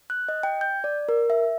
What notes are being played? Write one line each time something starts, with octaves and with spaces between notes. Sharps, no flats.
F#6
D#5
G5
G6
D5
A#4
E5